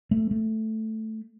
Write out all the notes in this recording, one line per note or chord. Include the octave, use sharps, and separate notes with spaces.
A3
A3